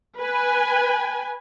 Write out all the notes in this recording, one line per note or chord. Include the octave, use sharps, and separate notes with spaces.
B4 G#5